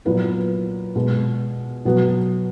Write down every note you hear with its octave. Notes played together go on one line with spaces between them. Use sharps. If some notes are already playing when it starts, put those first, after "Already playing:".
A#2 F#3 B3 E4 B4
B2 G#3 B3
B2 F#3 B3 F#4